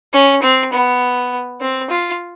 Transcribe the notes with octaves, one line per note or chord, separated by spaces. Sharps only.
C#4
C4
B3
C4
F4